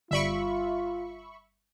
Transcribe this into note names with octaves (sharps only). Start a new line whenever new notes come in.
G1 G3 F4 E5 B5 C#6 D7